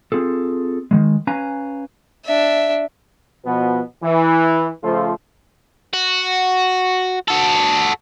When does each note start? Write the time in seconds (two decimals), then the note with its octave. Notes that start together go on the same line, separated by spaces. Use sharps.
0.12 C4 F4 G#4 A4
0.91 D#3 F#3 G#3
1.27 C#4 B4 F5 G#5 A#5
2.26 D4 E5
3.45 B2 F3 B3
4.03 E3
4.83 C#3 F3 A3 F4 A4 C5
5.93 F#4
7.28 F#4 A4